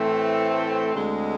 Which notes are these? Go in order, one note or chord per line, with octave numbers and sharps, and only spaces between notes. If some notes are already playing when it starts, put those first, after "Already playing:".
Already playing: A2 E3 A3 C4
D2 D3 G#3 C4